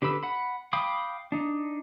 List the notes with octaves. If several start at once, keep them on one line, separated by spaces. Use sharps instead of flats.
D3 G4 B4 B5 E6
F#5 B5
F5 G5 B5 D6 D#6
D4 D#4